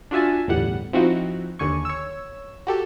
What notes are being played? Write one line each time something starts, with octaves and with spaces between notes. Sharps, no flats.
D4 F4 F#4 E5 G#5 A5
G1 E2 A2 G3 F#5
F3 C4 D#4 E4 F#4
D#2 D3 G#5 C#6
C#5 E6
F#4 G4 A4